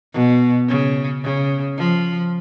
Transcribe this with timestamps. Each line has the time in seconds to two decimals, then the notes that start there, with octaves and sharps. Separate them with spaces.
0.13 B2
0.68 C#3
1.23 C#3
1.77 F3